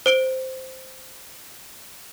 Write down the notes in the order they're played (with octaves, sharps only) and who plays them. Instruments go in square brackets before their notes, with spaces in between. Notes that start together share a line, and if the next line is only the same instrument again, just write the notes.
[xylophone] C5 D7 G7